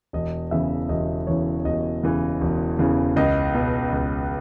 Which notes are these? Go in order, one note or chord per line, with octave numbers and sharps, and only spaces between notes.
E1 D#5
E2 C#3 E3 E5
E1 D#5
E2 C#3 E3 C#5
E1 D#5
E2 C#3 E3
E1
E2 C#3 E3
C#2 D#5
B2
C#2